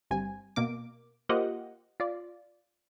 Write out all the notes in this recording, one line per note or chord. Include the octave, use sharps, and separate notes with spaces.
G1 G2 C4 G#5
B2 A#3 D6
A#3 F4 G4 C5 D#5 F#5
F4 D5